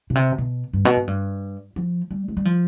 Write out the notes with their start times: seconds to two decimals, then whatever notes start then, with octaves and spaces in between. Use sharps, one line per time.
0.10 B2
0.15 C3
0.38 B2
0.73 G2
0.85 B2
0.96 G#2
1.07 G2
1.76 F3
2.11 G3
2.28 G#3
2.37 G3
2.45 F3